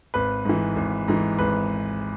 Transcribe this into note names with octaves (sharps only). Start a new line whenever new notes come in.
G#1 B4
G#2 E3
G#1
G#2 E3
G#1 B4